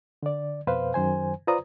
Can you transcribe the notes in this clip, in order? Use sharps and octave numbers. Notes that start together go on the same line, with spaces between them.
D3 D5
F2 B2 B4 C5 F5
F#2 D#3 C5 G#5
F4 B4 C5 D5 A#5 D#6